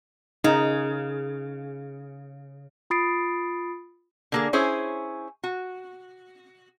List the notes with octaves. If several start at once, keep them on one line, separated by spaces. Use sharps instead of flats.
C#3 D#4
F4 B5 D#6 A6 C7 D7
D3 A#3 G#4
C#4 E4 G#4 C5 C#5
F#4